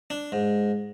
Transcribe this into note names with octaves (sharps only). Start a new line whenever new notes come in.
D4
G#2